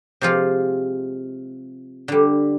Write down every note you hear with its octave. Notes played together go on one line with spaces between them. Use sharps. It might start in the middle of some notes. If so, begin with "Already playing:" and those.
C3 F3 G#3 F4
D3 G3